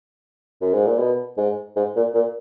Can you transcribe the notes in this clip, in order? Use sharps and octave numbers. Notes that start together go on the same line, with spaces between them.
F#2
G#2
A#2
B2
G#2
G#2
A#2
A#2